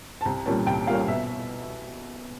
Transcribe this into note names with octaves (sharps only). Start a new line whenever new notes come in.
A5
C2 A#5
A#2 G3 A#3 C#4 A5
C2 G5
A#2 G3 A#3 C#4 F5
B2 E5